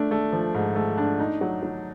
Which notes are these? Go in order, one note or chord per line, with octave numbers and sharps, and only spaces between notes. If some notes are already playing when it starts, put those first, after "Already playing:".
Already playing: A3 D4
A3
F3
G#2
A3
D4
D#4
F#3
F#3